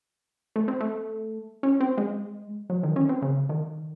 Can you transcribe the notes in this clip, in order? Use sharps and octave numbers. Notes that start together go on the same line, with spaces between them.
A3
C4
A3
C#4
C4
G#3
F#3
D#3
C#4
C4
C#3
D#3